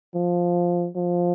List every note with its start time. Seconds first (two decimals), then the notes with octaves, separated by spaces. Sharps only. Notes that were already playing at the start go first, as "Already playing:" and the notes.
0.15 F3
0.96 F3